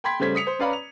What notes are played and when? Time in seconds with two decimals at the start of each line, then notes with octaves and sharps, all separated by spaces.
0.04 G5 B5 C6 G#6 B6
0.20 C#3 G3 A3 C5 G#6 B6
0.35 D#6 B6 C#7 F7
0.47 C5
0.59 C#4 B4 D5 F5 A#5 B5
0.73 F7